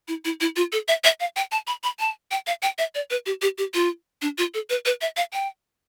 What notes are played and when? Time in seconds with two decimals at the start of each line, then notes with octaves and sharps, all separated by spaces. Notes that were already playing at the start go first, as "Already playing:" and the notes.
0.08 E4
0.25 E4
0.41 E4
0.56 F4
0.72 A4
0.88 E5
1.04 E5
1.20 F5
1.36 G5
1.52 A5
1.67 B5
1.84 B5
1.99 A5
2.31 G5
2.47 F5
2.62 G5
2.78 E5
2.95 D5
3.10 B4
3.26 G4
3.42 G4
3.58 G4
3.74 F4
4.22 D4
4.38 F4
4.54 A4
4.70 B4
4.85 B4
5.01 E5
5.17 F5
5.33 G5